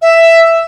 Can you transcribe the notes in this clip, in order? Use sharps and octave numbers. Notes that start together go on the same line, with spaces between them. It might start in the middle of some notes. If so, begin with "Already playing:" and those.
E5